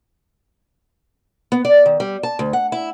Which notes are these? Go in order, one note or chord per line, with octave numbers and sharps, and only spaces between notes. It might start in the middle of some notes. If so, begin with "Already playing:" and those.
B3
D5
D#3
G3
A5
D2
F#5
E4